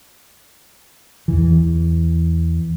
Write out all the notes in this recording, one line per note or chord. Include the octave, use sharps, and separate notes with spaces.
E2 E3